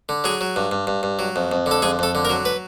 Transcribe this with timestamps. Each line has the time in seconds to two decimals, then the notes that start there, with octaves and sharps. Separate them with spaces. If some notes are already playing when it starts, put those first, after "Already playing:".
0.09 D3
0.24 F#3 G#4
0.41 F#3
0.56 G2
0.71 G2
0.87 G2
1.03 G2
1.19 F#3
1.36 F2
1.52 F2
1.66 D3
1.71 A4
1.82 F2 G#4
1.99 F2 A4
2.15 D3
2.25 A#4
2.29 F#3
2.45 B4